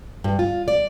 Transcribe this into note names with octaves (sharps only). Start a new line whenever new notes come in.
G2
F4
D5